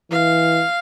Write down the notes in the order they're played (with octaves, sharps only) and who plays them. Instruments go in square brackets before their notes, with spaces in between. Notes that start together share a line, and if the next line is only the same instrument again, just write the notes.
[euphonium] E3 [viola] F5